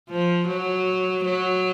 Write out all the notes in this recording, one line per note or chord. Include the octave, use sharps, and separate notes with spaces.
F3
F#3
F#3